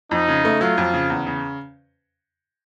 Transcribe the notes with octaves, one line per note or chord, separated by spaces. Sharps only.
F2 D#4
C#3
A3
F#3 F4
F2
C#3
E2
C#3